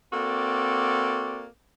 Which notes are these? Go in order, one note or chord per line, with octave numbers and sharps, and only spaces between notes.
A#3 C4 F#4 A4 D5